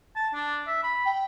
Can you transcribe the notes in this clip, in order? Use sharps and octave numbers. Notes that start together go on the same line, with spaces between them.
A5
D4
E5
B5
G5